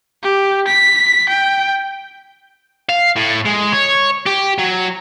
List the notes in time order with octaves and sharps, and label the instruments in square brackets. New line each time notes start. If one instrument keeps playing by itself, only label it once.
[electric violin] G4
B6
G5
[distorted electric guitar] F5
A2
G#3
C#5
G4
F#3